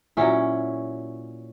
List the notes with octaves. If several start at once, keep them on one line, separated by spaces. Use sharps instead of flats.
A#2 F#3 C#4 E4